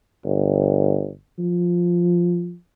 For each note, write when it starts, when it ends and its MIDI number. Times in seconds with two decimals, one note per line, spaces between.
0.25 1.10 31
1.39 2.55 53